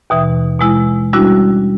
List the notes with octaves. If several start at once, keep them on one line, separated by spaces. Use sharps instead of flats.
D#2 B2 E3
B2 G#3 E4
G3 C#4 D4 E4 F#4